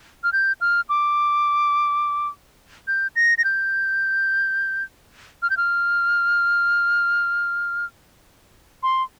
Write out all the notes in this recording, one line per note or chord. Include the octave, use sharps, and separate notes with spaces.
F6
G6
F6
D6
G6
A#6
A#6
G6
F6
G6
F6
C6